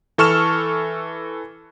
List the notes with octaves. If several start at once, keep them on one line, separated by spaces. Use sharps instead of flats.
E3 A4 C#6 F6 E7